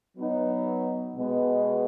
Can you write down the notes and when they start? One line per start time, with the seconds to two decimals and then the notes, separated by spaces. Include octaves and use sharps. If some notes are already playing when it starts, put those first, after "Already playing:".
0.18 F#3 B3 D#4
1.16 B2 G#3 B3